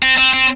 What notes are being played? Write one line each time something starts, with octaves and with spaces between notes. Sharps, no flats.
C4
C4
C4